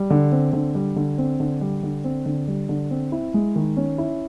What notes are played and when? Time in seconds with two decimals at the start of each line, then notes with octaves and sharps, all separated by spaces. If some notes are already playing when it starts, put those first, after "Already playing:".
Already playing: G3
0.10 D3
0.32 C4
0.53 D3
0.75 G3
0.96 D3
1.18 C4
1.40 D3
1.61 G3
1.83 D3
2.04 C4
2.26 D3
2.48 G3
2.69 D3
2.91 C4
3.12 E4
3.34 G#3
3.56 D#3
3.77 C#4
3.98 E4